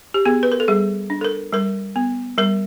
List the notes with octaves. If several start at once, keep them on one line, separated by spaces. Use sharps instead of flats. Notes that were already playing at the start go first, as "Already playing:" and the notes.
G4
B3 G#4
B4
A#4
A4
G3 G#4
D4
A4
A#4
G3 A#4
B3
G3 A#4